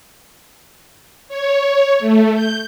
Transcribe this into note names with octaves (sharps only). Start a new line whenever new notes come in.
C#5
A3
G6